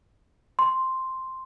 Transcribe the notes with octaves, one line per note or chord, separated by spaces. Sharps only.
C6